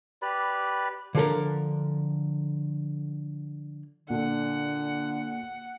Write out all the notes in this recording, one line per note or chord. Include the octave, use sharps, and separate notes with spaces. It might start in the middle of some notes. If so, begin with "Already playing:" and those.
G4 B4 D5 B5
D3 F3 A4 A#4
A#2 D3 F#5